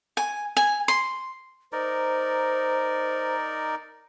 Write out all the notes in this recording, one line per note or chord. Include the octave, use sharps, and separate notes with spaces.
G#5
G#5
C6
D#4 A#4 C5 D5